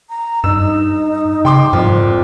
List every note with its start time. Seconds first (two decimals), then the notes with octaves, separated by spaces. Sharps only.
0.09 A#5
0.44 G2 D#4 E6 E7
1.45 C#3 G5 C6 D6
1.73 A#1 F2 G#2